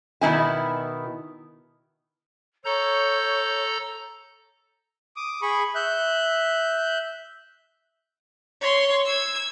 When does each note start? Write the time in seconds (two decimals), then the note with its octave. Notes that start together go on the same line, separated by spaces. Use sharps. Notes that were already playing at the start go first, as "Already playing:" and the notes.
0.21 B2 D#3 A#3 E4 G#5
2.65 A4 C#5 A#5 G6
5.16 D6 D#6
5.42 G#4 B5 C#6
5.75 E5 F#6 G6
8.61 C#5 C6
9.06 E6 G#6